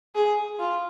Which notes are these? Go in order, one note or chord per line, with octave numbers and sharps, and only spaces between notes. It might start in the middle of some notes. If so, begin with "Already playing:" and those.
G#4
F4